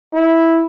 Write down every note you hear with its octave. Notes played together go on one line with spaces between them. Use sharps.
E4